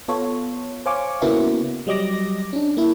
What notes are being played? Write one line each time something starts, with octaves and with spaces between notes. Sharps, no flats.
B3 F4 A4 C#5
C5 C#5 F5 G#5 C#6 D6
C#3 A#3 B3 C#4 E4 F#4
F#3 G3 D#5 D6 A#6
C#4 D4
A#3 E4